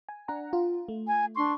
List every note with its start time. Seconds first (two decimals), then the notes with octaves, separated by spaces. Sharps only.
0.09 G#5
0.28 D4 F#5 A#5
0.53 F4
0.88 A3
1.07 G#5
1.35 D4 C6 C#6